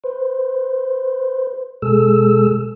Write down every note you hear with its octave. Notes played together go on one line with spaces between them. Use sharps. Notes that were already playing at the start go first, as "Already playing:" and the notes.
B4 C5
B2 G#3 G#4 A4 E6